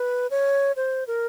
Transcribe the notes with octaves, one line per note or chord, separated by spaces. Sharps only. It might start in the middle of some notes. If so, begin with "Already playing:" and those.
Already playing: B4
C#5
C5
A#4